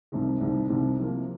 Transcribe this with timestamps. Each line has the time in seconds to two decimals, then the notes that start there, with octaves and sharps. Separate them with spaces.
0.12 C2 C3 D#3
0.41 C2 C3 D#3
0.69 C2 C3 D#3
0.99 C3 F3 A#3